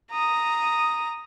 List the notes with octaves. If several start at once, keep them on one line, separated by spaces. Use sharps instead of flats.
A#5 D#6